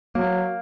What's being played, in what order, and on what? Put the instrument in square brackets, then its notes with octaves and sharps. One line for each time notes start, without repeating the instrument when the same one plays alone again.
[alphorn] F#3 [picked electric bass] A#3